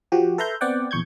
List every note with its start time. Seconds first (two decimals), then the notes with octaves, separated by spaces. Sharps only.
0.12 F3 F#4 G4
0.38 A4 B4 E5 A#5 C6 G6
0.61 B3 C4 D5 F#5 G5
0.91 A#1 E2 C#6 G6 G#6